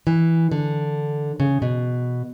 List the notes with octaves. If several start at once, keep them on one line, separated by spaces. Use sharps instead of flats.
E3
D3
C#3
B2